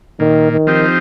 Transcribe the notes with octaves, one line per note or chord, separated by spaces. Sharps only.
A#2 D#3
D#3
F3 C4 D#4 G4